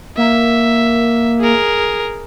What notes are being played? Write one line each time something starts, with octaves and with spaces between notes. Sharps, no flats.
A#3 E5
G#4 A#4